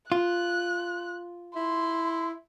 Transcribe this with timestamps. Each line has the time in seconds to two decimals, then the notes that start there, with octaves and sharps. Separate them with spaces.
0.12 F4 F#6
1.56 E4 C6